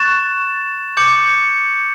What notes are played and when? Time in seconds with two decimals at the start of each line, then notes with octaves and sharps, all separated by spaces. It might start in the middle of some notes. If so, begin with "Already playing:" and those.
Already playing: C#6 F#6 A6 E7
0.97 D6 G6 C#7 F#7